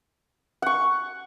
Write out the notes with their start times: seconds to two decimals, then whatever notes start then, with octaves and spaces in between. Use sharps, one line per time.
0.62 F#5 C#6